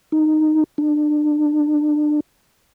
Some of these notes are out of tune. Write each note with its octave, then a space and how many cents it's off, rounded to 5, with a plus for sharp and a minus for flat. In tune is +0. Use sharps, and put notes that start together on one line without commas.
D#4 -10
D4 +30